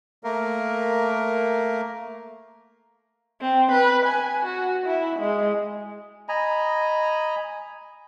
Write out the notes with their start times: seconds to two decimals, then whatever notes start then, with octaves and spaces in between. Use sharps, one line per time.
0.24 A3 A#3 A#4
3.41 C4
3.72 B4
4.05 G#5
4.45 F#4
4.86 E4
5.19 G#3
6.29 D#5 G#5 A#5 B5